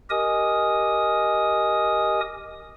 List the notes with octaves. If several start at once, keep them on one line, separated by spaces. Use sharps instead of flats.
G4 A#4 D#5 G#5 D#6